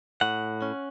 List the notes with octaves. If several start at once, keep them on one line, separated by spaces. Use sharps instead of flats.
A2 F#5
C#4